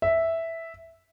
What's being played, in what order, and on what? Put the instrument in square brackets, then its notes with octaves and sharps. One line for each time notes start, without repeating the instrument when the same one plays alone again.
[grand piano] E5